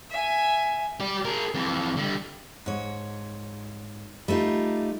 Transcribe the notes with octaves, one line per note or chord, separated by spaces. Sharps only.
E5 G#5
G4 D5
G#4 A#4
F2 E3
D3 G3
G#2 C#5
G3 A3 B3 D#4 F4